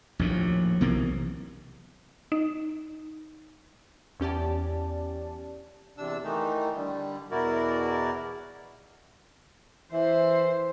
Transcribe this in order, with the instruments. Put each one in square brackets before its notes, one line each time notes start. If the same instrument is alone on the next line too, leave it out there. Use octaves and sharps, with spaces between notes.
[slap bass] A#1 D#2 A2
B1 C3 E3 A#3
[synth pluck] D#4
[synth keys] E2 C#4 G4 D5 A5
[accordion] E2 C3 D4 E6
D#3 E3 A3 D#4
D3 G3
E2 B2 E4 F#4 A#4 D5
[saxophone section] E3 E5 [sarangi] C5